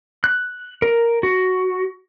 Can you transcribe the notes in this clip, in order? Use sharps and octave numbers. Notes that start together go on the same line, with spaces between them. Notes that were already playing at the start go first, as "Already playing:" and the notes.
F#6
A#4
F#4